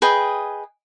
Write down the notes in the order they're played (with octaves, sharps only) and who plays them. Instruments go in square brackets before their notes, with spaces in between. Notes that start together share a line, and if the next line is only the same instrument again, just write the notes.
[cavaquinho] G#4 B4 D#5 G5